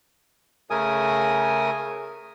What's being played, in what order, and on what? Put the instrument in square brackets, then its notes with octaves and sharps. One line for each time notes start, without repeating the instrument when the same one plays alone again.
[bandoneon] C#3 A3 A#4 G#5 D#6